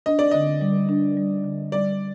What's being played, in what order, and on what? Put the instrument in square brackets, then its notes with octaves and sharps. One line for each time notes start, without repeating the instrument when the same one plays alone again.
[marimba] D4 [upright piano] D#5
[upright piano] D5
[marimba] D3 [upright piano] D#5
[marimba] G3
D4
G3
D3
[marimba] G3 [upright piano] D5